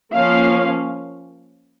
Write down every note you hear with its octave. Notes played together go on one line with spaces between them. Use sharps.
F3 A#3 C#4 F5